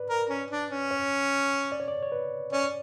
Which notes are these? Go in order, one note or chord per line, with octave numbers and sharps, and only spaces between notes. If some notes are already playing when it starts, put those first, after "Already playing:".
Already playing: B4 D5
A#4
C#4
D4
C#4
C#5
D5
C#5
D5
C#5
B4
C#4 D5